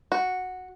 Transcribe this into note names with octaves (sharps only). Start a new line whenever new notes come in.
F#4